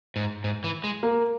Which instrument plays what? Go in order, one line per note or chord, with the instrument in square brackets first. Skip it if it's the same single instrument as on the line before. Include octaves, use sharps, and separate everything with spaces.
[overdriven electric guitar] G#2
G#2
E3
G#3
[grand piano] A#3